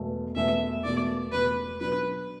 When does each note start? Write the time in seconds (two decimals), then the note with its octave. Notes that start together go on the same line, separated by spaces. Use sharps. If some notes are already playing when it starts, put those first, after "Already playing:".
Already playing: E1 E2 B2 A3
0.35 E1 E2 B2 A3 E5
0.84 E1 E2 B2 A3 D5
1.32 E1 E2 B2 A3 B4
1.80 B2 F#3 D4 B4